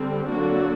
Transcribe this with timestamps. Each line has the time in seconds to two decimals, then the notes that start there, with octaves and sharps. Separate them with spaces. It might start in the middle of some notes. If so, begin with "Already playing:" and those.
Already playing: D3 G3 C4
0.28 D3 F#3 A#3 D4 F#4